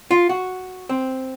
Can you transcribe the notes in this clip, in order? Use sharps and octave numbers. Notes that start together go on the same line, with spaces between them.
F4
F#4
C4